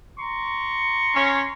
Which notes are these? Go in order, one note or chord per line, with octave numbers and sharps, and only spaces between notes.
A#5 C6 C#6
C#4